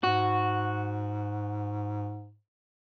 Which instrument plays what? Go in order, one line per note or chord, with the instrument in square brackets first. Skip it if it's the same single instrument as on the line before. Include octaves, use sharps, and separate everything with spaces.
[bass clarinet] G#2 [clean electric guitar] F#4